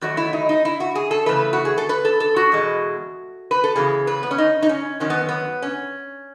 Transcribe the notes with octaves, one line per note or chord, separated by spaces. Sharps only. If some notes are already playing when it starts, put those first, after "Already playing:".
E2 D#3 F#3 A3 F#4
E4
D#4
D#4
E4
F#4
G#4
A4
C#3 E3 A3 B4
F#4
G#4
A4
B4
A4
A4
F#4
E2 B2 G#3
B4
A4
C#3 E3 B3 G#4
B4
B3
C#4
D#4
D#4
C#4
F#2 D#3 F#3 C#4
B3
B3
C#4